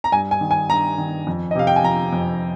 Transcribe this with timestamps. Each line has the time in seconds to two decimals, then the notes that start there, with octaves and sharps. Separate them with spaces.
0.04 A#5
0.12 G2 G#5
0.31 G#5
0.41 D#3
0.51 G#5
0.69 G2 A#5
0.98 D#3
1.27 F2
1.51 D#5
1.55 C3 F5
1.67 G5
1.76 G#5
1.84 F3 A#5
2.13 F2